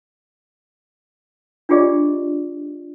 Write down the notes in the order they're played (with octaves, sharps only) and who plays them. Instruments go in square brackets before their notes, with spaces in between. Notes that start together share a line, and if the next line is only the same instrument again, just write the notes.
[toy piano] D4 F4 G4 G#4 D5 D#5